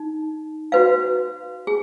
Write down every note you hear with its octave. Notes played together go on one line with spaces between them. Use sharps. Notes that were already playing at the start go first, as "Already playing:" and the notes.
Already playing: D#4
F#4 B4 F5
G#4